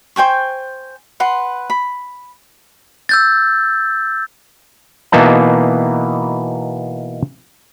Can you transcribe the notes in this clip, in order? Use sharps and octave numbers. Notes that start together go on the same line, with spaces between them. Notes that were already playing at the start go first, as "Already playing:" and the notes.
C5 G5 G#5 C#6
B4 F#5 C6
B5
E6 G6 A6
B2 E3 A#3 B3 D#4 A5